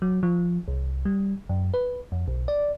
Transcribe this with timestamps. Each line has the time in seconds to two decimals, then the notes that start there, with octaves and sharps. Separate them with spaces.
0.02 F#3
0.23 F3
0.68 C2
1.05 G3
1.49 F#2
1.74 B4
2.12 F2
2.28 B1
2.48 D5